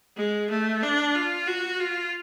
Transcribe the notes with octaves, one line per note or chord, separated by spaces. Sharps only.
G#3
A3
D4
F4
F#4
F4